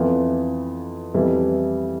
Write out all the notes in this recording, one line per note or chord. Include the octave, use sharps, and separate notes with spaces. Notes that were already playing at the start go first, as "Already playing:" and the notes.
Already playing: F2 E3 B3 F4
F2 E3 G3 B3 E4